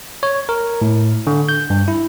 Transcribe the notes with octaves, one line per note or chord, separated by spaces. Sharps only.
C#5
A#4
A2
D3
G6
G2
E4